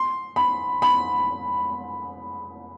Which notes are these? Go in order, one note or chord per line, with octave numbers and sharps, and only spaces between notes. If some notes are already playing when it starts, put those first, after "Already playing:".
Already playing: C6
B5
B5